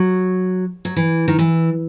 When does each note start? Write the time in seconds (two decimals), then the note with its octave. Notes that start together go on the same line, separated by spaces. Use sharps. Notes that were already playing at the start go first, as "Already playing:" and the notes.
Already playing: F#3
0.85 F#3
0.96 E3
1.28 D#3
1.39 E3